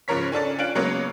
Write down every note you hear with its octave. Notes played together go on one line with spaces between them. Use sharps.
G#2 C#3 F3 A#4 C#5 B6
C#4 D4 A4 D5
C#4 D4 F4 F#6 D7 F#7
C#3 F#3 G#3 A#3 B3 C#5